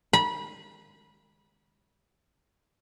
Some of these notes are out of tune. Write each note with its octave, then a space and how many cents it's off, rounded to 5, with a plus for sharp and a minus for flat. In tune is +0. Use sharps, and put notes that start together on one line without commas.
B5 -25